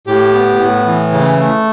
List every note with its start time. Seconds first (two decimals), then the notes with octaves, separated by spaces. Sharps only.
0.07 A2 G4
0.34 B3
0.60 A2
0.86 E3
1.13 C#3
1.39 A3